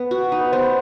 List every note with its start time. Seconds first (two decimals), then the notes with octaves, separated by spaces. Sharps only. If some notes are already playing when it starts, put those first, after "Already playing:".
Already playing: B3 B4
0.11 F#4
0.32 D#4
0.41 B4
0.52 B3 C5